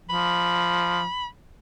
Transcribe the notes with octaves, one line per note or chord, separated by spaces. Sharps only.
F3 B5